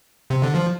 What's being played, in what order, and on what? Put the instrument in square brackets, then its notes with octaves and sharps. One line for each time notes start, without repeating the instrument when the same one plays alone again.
[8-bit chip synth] C3
D3
F3